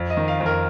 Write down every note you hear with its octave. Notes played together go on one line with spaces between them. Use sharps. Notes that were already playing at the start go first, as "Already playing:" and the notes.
Already playing: F2
D#5
D#3
F5
F2
A#4